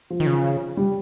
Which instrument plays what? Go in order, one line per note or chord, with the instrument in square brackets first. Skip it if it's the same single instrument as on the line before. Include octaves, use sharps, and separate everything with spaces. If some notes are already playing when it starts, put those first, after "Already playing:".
[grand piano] F3
[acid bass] D#3
C#3
[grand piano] G3